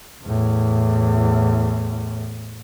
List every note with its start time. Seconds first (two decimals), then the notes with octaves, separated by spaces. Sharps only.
0.23 E2 A2